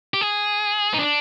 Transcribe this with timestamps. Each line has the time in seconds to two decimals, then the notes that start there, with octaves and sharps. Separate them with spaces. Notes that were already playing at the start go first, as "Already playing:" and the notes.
0.14 G4
0.21 G#4
0.94 D#4
0.99 D4